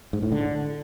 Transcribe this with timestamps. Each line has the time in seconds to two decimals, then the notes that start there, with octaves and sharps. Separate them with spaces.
0.13 G#2
0.22 A2
0.32 D3